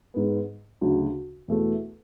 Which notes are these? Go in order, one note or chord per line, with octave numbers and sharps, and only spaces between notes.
G#2 G#3 B3
D2 C#3 F#3
E2 B2 A3 E4 A4